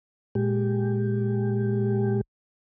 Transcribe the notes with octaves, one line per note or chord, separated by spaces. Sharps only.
A#2 G#3 G4